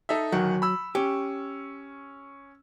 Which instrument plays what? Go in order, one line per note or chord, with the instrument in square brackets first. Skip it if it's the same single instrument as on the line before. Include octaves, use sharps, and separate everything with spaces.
[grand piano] D#4 A4 E5
[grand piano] D1 D#3 F#5 [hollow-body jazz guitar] F#3
[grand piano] B5 E6
[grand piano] C#4 [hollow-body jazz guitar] G4